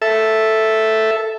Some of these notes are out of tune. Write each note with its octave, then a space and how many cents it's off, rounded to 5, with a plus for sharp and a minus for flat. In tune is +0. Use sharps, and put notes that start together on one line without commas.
A4 +0 E5 +0